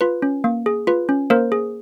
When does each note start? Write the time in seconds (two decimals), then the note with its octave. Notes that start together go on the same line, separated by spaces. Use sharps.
0.01 F4 B4
0.22 C#4
0.44 A#3
0.66 G#4
0.87 F4 B4
1.09 C#4
1.30 A#3 A#4 C5
1.52 G#4